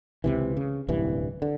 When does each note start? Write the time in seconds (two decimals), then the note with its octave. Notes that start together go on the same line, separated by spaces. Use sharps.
0.24 C#2 C3 E3
0.57 C#3
0.89 D1 C2 G2 E3
1.42 D3